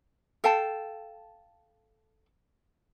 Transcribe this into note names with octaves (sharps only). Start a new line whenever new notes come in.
A4 F5 G5 A5